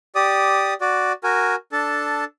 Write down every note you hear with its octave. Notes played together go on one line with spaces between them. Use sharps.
G4 D5 D#6
F#4 D5
F#4 A#4 G#5
D4 A4 A5